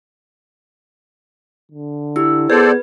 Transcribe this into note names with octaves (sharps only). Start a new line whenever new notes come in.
D3
E4 G4 E6
B3 G#4 A4 B4 C5 D5